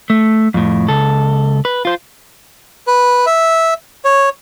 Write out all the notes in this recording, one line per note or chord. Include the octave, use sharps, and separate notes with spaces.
A3
F2 A2
C#2 A4
B4
F4 C5
B4
E5
C#5